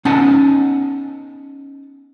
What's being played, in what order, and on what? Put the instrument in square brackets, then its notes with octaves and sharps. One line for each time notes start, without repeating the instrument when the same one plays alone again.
[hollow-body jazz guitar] B3 C#4 D#4 F#5 A5